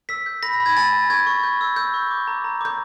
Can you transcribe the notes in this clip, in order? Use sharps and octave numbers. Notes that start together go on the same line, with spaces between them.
E6 B6
G6
B5 A#6
B5
G#6
G#5 A6
G#5
C#6 G#6
C#6
G6
E6
E6 G6
C#6
D6
A#5
A#5
D6 G6